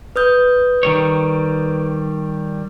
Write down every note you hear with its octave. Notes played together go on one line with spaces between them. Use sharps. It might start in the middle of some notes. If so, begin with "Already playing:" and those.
B4 D#6 G6
D#3 G3 C#5